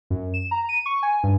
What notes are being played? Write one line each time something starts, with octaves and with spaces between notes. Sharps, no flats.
F#2
E7
A#5
D#7
C#6
G#5
G2